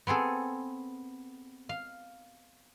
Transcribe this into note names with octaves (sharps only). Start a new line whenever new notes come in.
B3 C4 G#4 A4
F5